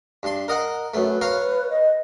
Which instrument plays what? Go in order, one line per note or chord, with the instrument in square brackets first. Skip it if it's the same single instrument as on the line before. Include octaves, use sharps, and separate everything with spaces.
[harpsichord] G2 C6
A#4 D#5 F#5
[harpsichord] F#2 A3 [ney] B4
[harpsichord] C#5 F5 A#5
[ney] D#5